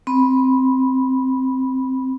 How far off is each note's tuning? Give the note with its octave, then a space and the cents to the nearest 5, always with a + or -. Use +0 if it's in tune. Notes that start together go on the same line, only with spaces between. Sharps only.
C4 +0 B5 -15